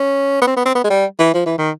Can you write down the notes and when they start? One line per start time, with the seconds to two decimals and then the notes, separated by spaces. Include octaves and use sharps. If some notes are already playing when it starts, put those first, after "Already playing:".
Already playing: C#4
0.42 B3
0.47 C4
0.57 B3
0.65 C4
0.75 B3
0.84 G#3
0.90 G3
1.19 E3
1.34 F3
1.46 E3
1.58 D#3